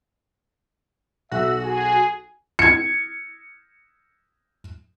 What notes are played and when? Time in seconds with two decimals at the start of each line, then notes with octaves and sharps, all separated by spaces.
1.31 B1 F#4 E5
1.63 G#4 G#5
2.59 G#6 C#7